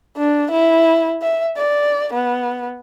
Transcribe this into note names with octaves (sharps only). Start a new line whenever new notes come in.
D4
E4
E5
D5
B3